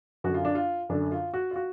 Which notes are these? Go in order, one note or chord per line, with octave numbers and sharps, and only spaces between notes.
F#2 D3 F#4
F4
D4
F4
F#2 D3 D4
F4
F#4
F4
F#4